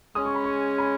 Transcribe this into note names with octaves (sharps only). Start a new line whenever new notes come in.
C#3 G#3 C#4 D#6
C#6
B5
C#6
B5